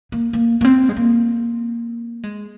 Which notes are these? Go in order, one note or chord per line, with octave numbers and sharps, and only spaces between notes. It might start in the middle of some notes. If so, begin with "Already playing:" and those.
A#3
A#3
A#3
C4
G#3
A#3
G#3